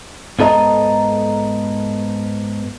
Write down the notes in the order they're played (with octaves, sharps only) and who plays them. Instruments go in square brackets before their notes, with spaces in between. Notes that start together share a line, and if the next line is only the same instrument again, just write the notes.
[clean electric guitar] G#2 B3 A4 D#5 A#5